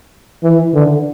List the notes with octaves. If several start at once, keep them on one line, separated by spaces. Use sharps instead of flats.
E3
D3